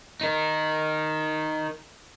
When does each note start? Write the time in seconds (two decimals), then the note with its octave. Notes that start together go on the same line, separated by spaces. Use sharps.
0.21 D#4 A#4